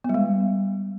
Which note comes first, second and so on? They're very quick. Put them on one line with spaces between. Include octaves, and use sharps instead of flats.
B3 G3 G#3